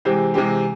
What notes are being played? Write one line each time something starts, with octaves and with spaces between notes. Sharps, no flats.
C3 E3 G#3 C4 G4
C3 E3 G#3 C4 G4